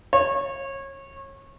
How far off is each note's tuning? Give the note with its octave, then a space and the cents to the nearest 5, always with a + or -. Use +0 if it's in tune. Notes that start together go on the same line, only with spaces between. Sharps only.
C#5 -25